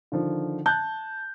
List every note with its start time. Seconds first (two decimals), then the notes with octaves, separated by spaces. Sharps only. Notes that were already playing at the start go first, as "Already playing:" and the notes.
0.12 D3 D#3 F3
0.66 A5 F#6 G6